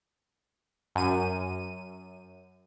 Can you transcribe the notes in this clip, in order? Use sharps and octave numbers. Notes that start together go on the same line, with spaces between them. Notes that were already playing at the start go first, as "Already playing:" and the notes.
F#2 D#7